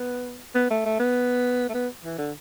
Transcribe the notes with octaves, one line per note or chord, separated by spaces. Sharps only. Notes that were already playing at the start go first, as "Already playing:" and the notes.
Already playing: B3
B3
A3
A3
B3
A3
B3
E3
D3